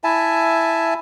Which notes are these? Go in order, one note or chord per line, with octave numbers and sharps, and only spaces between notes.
E4 E5 G#5 A5